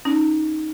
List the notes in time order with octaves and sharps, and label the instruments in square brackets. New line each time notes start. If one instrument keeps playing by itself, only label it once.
[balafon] C#4 [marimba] D#4